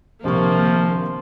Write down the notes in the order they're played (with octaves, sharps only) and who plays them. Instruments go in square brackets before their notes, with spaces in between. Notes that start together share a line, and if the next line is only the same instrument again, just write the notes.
[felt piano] A#1 G3 C#6 [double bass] C3 D#3 [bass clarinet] F3 [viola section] A#3